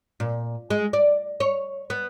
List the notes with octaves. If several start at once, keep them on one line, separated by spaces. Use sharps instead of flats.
A#2
G#3
D5
C#5
B3